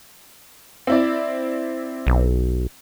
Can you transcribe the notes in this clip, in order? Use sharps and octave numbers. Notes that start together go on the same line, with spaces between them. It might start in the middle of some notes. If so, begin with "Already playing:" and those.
C4 E4 D5
B1